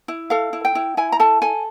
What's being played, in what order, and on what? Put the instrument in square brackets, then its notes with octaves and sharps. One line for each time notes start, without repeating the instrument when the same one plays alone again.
[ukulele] E4
A4 F5
E4
G5
E4
E4 G#5
A#5
A4 A5
A4 G#5